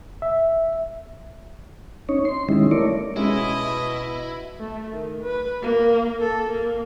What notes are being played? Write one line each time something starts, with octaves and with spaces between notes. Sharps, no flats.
E5
C#4 D#4 C#5
C6
D#3 G3 G#3 C#4 D#4 E4
A3 E4 A#4 C#5 D5
B2 G#3 C#4 E4 D#5
A3
D#3
B4
A#3
A4
A#3